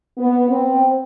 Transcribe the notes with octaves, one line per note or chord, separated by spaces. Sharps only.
B3
C4